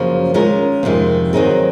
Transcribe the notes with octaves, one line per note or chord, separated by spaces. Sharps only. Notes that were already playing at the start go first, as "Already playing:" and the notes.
Already playing: F#2 C#3 F3 A#3
D#3 G#3 C#4 F4 A#4
F2 C3 D#3 G#3
D#3 F#3 C4 D#4 G#4